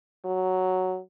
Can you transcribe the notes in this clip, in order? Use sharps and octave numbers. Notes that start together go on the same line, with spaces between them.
F#3